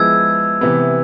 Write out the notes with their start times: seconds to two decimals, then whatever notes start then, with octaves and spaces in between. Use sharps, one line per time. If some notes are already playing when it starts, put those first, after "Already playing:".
Already playing: F3 G#3 B3 E4 G#4 E6 G#6
0.61 C3 E3 B3